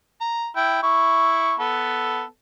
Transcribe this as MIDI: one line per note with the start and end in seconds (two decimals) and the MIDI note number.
0.21 0.47 82
0.56 0.78 64
0.56 0.78 79
0.83 1.54 64
0.83 1.54 85
1.60 2.23 59
1.60 2.23 69